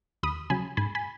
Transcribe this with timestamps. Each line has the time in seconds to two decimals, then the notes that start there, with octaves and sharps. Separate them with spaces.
0.23 D#2 B5 D#6
0.50 C#3 F#3 G#5 B5
0.77 G#2 G#5 B5
0.95 G#5 B5